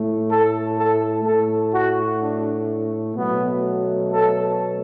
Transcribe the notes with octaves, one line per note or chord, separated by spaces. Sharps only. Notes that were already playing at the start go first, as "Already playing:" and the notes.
Already playing: A2 A3
A4
A4
A2 A3 A4
F#4
D4
B2 F#3 A3 B3
A4